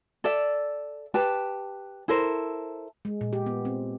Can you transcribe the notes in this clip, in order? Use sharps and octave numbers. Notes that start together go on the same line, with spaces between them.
A4 D5 E5
G4 B4 A5
E4 A4 A#4 C5
G#3
A#2
G4
B3
C4